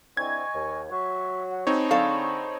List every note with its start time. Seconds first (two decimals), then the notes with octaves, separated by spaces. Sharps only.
0.17 D3 C4 E4 D#5 G#5 C#6 G#6
0.54 D#2
0.90 F#3 F#4 E5 C#6
1.50 F#5
1.67 C4 D#4 G#4 C#5 A5 B5
1.91 D3 A4 F5 C#6